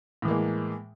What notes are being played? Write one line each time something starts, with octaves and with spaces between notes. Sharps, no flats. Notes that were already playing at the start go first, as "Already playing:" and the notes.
A2 E3 G#3 A#3